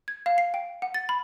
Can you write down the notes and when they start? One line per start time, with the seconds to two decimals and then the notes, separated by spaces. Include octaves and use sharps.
0.08 G#6
0.26 F5
0.38 C7
0.54 G5
0.82 F#5
0.94 A6
1.09 B5